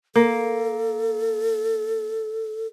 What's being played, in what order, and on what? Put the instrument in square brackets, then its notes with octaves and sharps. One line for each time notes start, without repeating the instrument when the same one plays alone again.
[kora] A#3 [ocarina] A4